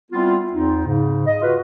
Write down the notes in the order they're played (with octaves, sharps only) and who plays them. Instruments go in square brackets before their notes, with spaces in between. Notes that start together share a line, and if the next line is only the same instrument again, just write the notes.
[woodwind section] G3 B3 C4 E4 F4
E2 C4 D#4
G#2 C#3
D#5
F4 F#4 B4